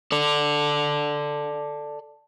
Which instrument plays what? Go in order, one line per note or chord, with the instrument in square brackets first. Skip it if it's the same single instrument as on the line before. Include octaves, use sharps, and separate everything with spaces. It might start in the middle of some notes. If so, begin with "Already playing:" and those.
[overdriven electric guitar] A4 D5